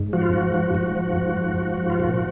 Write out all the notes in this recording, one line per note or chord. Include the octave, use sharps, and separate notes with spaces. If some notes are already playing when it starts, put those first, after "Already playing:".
Already playing: G#2
F3 F#4
F4
G#2 F#4
F3
G#2 F#4
F3
G#2
F3
G#2
F3
F4
A#2 F#4